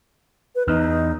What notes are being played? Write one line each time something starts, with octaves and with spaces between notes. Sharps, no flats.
B4
E2 D#4